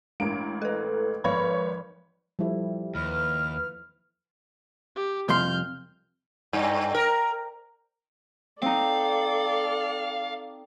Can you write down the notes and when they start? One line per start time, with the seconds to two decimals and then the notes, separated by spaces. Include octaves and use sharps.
0.20 A1 G#3 A#4 D7
0.62 A4 B4
1.24 G#1 F3 B4 C#5 B5 C#6
2.39 F3 G3 E4 A4
2.95 D#2 B4 F6
4.96 G4
5.29 C2 F2 C6 F6 G6
6.53 G2
6.95 A#4
8.62 C4 D#4 A4 D5 F5